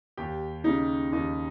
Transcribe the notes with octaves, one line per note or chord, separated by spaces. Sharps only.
D#2 G4
C#3 D#4
D#2 D#4